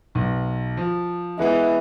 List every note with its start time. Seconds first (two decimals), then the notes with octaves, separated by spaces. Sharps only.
0.15 B1
0.77 F3
1.39 E3 G#3 B3 G#4